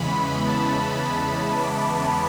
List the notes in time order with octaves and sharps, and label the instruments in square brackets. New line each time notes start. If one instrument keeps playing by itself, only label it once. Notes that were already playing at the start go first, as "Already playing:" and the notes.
Already playing: [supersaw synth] E2 C#3 E3 G#3 B3 B5
A5
D6